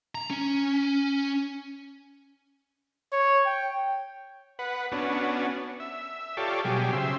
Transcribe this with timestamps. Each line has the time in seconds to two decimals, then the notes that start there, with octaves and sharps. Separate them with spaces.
0.15 A#5
0.30 C#4
3.12 C#5
3.46 G5
4.59 B4 F#5
4.92 B3 C#4 D4 F#4
5.80 E5
6.37 F4 G4 A4 C#5 D5
6.65 B2 F#3 G3 G4 G#4
6.93 C#3 C5 E5